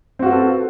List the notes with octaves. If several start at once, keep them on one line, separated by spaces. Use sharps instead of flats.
C4 F4 F#4 A4 B4